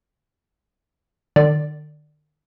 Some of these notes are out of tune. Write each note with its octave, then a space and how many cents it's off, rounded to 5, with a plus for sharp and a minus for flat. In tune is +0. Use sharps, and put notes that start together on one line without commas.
D3 +45 D5 +0